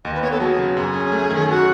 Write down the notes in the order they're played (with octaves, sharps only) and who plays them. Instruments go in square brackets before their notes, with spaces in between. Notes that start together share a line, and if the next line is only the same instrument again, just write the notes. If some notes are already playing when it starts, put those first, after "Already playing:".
[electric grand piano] D#2 [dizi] D#5
[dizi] B4
[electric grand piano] B3 [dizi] C#5
[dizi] A4
[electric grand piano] F#3 [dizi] G#4
[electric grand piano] C#3
[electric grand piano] F#2 [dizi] G#4
[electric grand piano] C#4
A3
D#3
[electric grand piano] F#2 [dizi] F#4